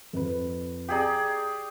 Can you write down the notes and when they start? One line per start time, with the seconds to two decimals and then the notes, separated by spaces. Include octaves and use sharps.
0.13 F2 B4
0.88 G4 G#4 D5 G5 A#5